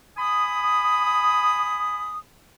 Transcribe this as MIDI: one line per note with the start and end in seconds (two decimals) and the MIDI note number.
0.17 2.18 80
0.17 2.18 83
0.17 2.18 87